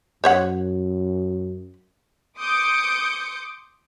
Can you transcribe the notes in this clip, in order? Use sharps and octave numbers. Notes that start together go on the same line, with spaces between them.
F#2 C5 C#5 F#5
C6 D6 D#6 G6 C#7 D7